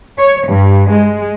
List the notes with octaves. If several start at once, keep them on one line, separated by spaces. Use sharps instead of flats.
C#5
G2
G#3